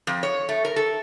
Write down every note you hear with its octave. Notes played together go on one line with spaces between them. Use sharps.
F2
C#5
A3
A#4
A4